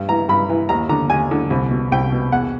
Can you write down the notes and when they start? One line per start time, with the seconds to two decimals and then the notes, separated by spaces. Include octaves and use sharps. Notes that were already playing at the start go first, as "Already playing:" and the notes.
Already playing: G2
0.09 E3 A#5
0.29 G2 B5
0.49 E3
0.69 D#2 A#5
0.89 D3 A#5
1.10 D#2 G#5
1.31 D3
1.50 C2
1.71 B2
1.92 C2 G5
2.12 B2
2.32 E2 F#5